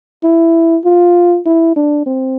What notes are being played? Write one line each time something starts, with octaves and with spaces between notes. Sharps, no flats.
E4
F4
E4
D4
C4